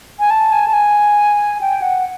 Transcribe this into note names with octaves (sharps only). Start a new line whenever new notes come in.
G#5
A5
G#5
A5
G#5
G5
F#5